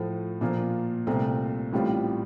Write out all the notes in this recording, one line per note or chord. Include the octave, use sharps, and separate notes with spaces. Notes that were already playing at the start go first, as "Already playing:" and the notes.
Already playing: A2 F3 A3
A#2 F3 A#3 F4
C2 A#2 A3 C4
A1 A2 G3 C4 F4